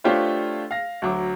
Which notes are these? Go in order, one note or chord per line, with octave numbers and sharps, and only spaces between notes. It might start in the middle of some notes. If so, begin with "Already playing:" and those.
A3 D4 F4 G4 C5 C#5
F5 A#6
D2 F#3 D6